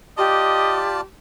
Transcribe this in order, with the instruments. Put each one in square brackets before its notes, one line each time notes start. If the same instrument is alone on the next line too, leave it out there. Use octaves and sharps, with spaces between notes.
[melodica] F4 D5 A5 [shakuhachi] G4 [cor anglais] D#5